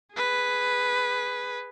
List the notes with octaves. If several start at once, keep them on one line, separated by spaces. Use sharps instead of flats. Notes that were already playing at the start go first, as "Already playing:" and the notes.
G#4 B4